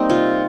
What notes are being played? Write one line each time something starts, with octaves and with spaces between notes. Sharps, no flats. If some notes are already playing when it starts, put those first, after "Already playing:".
Already playing: G3 A#3 C4 D#4
C3 F4